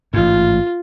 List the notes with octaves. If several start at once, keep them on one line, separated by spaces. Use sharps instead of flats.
A1 G#2 F4